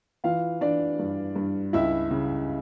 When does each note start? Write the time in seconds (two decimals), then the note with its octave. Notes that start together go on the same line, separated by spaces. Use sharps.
0.24 E3 F4 F5
0.61 E3 D4 D5
0.99 G2
1.35 G2
1.73 C#2 E4 E5
2.11 C#3